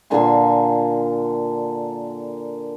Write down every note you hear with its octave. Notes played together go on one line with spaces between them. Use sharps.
A#2 D3 G#5 C6